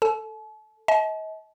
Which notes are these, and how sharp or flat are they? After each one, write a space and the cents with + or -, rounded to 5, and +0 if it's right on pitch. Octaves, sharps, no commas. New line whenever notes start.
A4 +10 A5 -40
D#5 +40 A5 -40